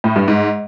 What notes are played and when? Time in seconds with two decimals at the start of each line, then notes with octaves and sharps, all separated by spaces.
0.04 A2
0.16 G2
0.28 G#2